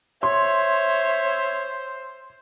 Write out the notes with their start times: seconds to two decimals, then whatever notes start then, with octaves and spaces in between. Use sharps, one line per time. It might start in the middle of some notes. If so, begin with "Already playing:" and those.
0.23 C5 C#5 E5 C6